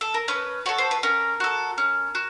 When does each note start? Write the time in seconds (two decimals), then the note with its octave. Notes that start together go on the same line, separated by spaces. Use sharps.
0.01 A4
0.14 A#4
0.28 C#4 B4
0.66 F#4 A4 C#5
0.78 C5
0.91 B4
1.03 C#4 A#4
1.40 F#4 A4
1.78 C#4
2.15 F#4